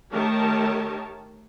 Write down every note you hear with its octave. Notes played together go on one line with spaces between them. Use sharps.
D#3 A3 G4 A#4 C#5 A5